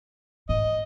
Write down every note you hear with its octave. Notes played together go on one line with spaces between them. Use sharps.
G#2 D#5